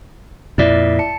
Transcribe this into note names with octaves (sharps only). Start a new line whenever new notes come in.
F2 A#2 E4 D5 E5
A5 C#7